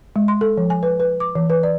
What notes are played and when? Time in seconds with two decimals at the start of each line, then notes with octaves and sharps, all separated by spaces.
0.16 G#3
0.28 C6
0.41 A4
0.57 F3
0.70 G#5
0.83 B4
1.00 B4
1.20 D6
1.35 E3
1.50 B4
1.63 D5